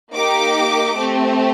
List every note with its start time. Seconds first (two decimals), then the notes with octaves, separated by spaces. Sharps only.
0.15 A#3 D#4 G4 D6
0.97 A3 C4 G4